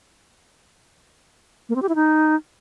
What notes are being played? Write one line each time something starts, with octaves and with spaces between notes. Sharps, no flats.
A#3
C4
G4
E4
D#4